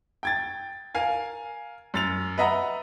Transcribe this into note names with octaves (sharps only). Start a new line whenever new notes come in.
G5 G#6 A6
A#4 F5 G#5
F#2 A6 F7
B4 D#5 E5 F#5 A#5